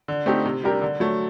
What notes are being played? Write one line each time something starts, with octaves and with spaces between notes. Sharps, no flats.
D3
A3 C4 D#4 G4
C3
G3 D4 G4 A#4
D3
F#3 A3